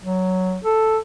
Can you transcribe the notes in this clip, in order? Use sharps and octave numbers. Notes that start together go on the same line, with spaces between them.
F#3
A4